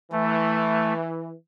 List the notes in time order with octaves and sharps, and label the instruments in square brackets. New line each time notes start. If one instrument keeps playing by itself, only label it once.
[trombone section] E3 [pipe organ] A3